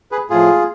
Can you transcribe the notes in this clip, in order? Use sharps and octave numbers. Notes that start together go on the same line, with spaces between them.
G#4 B4
A2 F3 F4 G#4